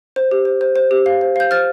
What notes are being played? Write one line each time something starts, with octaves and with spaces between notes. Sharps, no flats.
C5
G4
C5
C5
C5
G4
F5
C5
F5 G6
C5 F6 A6